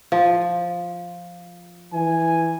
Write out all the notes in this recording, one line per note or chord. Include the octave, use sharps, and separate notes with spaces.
F3
E3 G#5